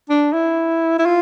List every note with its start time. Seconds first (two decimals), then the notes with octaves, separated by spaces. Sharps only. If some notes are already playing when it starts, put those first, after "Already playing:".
0.09 D4
0.33 E4
0.99 E4
1.06 F4